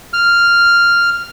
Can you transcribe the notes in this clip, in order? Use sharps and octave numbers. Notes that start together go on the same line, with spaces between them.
F6